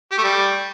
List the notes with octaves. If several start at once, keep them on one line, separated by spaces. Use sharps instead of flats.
G4
A3
G3